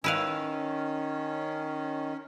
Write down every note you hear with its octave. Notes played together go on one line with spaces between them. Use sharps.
D#3 C#4 E4 B4 F5